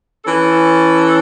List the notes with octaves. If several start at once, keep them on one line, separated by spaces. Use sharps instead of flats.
E3 C#4 A4